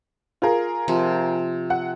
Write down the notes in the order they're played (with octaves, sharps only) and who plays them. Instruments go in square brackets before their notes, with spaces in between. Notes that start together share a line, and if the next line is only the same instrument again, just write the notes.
[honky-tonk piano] F4 G#4 A#4
[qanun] C3 F3
[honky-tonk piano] F#5